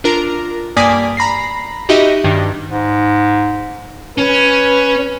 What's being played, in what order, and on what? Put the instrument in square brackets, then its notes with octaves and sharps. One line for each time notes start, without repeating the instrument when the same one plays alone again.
[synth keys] D4 F4 A#4 A#5
G2 A#3 D5 G#5 D#6 B6
A#5 B5 A#6 C7
D#4 F#4 G4 D#5 E5 B5
G2 D#3 D4 D#4
[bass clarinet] G#2
[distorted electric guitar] C#4 [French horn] B4